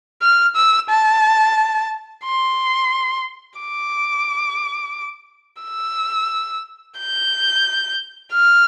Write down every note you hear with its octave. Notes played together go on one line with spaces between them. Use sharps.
F6
E6
A5
C6
D6
E6
G6
F6